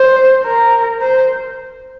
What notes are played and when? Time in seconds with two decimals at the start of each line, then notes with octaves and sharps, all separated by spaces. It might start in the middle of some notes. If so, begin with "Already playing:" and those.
Already playing: C5
0.44 A#4
1.01 C5